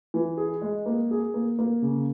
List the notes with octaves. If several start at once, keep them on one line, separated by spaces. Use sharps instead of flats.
E3
G#4
G#3
A#3
G#4
A#3
A#3
C#3